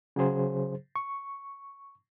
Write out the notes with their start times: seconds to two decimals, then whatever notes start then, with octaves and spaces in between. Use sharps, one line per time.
0.16 C#3 F#3 G#4 C5
0.96 C#6